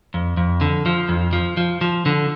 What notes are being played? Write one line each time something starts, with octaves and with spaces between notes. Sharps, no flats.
F2
F2
D3
F3
F2
F3
F3
F3
D3